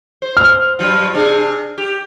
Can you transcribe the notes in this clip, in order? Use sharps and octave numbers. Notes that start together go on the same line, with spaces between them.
C5
F6
G2 F#3 F4
C3 D4 G#4
G4